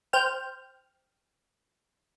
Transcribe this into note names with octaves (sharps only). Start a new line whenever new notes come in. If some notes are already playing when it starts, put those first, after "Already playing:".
C5 G5 F6